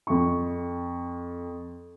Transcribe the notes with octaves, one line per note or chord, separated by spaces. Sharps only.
F2 C#6